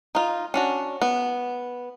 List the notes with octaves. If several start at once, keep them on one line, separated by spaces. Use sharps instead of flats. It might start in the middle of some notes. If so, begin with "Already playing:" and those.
D#4 F4
C#4 D4 F#4
B3